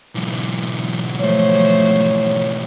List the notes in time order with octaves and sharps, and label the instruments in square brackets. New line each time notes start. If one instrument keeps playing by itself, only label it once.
[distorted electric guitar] B1 G#2
[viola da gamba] F3 A3 C5 [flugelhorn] C#5